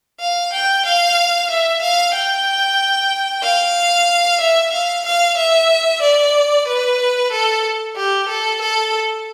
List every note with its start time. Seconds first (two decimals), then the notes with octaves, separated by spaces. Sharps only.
0.20 F5
0.53 G5
0.85 F5
1.50 E5
1.82 F5
2.14 G5
3.43 F5
4.40 E5
4.72 F5
5.05 F5
5.37 E5
6.02 D5
6.67 B4
7.31 A4
7.96 G4
8.29 A4
8.61 A4